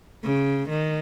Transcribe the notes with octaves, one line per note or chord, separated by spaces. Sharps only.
C#3
D#3